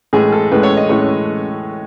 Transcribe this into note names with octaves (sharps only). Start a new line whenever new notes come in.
A2 E3 G#3 G#4
A4
A2 E3 G#3 B4
C#5
D#5
A2 E3 G#3 C#5